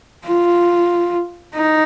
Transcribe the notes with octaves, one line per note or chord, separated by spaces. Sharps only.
F4
D#4